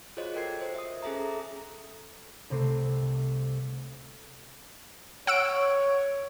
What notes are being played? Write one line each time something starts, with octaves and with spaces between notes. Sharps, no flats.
F4 F#4 G#4 C5 C#5 D#5
F#4 A4 A#4 G5 G#6 C7
C5
E5 D#6
C#4 G#4 A4 E5 A#5
A#5
C2 C3 A3 C4 C7
C#5 F#5 E6 D7